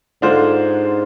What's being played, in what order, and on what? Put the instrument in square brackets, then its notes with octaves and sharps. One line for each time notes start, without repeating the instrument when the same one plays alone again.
[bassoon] G#2 [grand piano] D3 G#3 D4 F4 C5